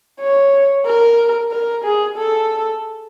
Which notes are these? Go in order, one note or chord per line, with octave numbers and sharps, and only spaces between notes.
C#5
A#4
A#4
G#4
A4